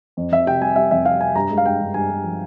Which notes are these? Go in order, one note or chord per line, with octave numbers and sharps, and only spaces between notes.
F2
F2 E5
C3 G5
G3 G#5
G3 E5
F2 E5
C3 F5
C3 G#5
G2 A#5
G#3
F5
G2 G5
G2
G2 G#5
G2
F3